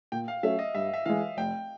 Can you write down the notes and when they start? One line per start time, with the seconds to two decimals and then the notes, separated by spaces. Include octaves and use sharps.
0.12 A#2 G5
0.28 F5
0.43 F#3 A3 C#4 E5
0.59 D#5
0.75 G2 E5
0.94 E5
1.06 E3 G#3 F5
1.37 F1 G5